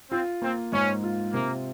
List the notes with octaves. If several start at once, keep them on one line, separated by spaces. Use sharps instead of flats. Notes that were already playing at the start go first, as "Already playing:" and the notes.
C4 F4
A#3 C4
G#2 C#4
F4
C3 A#3